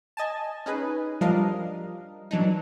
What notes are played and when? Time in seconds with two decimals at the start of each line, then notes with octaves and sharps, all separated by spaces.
0.17 D#5 G#5 A5
0.66 C#4 D#4 G#4 B4
1.21 F3 G3 D4 A#4 D#5 F5
2.31 E3 F#3 D4 D#4